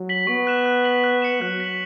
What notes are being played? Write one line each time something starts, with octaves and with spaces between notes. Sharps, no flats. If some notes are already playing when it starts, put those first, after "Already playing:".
Already playing: F#3
B6 F#7
B3 C#6
F#6 E7
F#6
B6 F#7
F#6
C#7 E7
F#3 F#6
B6 F#7